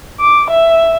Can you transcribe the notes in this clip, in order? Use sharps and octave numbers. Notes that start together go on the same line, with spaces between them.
D6
E5